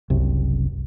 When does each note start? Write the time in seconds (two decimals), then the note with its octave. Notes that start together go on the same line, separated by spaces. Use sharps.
0.10 F#1 C2